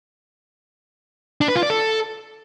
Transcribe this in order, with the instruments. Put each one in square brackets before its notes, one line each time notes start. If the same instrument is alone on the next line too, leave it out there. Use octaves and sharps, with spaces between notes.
[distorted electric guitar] D4
B4
F4
D5
A4